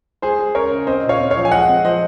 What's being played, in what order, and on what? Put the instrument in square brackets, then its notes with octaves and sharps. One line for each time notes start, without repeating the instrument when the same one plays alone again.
[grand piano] G#3 G#4 C5
G#3
C#3 A#4 C#5
C#3
C4 C5 D#5
A#2
C#5 F5
C4
C#5 F5
F3
G#5
G#3 D#5 F#5
C4
F3 C5 D#5